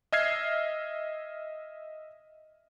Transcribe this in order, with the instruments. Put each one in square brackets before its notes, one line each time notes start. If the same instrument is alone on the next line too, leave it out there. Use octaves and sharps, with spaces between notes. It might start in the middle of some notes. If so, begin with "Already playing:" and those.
[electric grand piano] D#5 E5 F6 G#6 C7